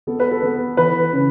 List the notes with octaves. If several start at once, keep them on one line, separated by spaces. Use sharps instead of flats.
B3 A4
B4
A4
B3
E3 B4
C#3